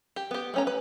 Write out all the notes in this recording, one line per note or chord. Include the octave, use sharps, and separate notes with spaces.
G4
B3 G4
A3 C#4 A#5
B4